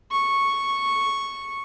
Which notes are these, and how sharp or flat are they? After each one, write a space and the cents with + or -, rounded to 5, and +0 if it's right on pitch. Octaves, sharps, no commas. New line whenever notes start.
C#6 -5